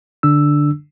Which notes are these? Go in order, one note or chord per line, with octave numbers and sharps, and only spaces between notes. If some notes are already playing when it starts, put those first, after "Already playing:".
D3 D4 E6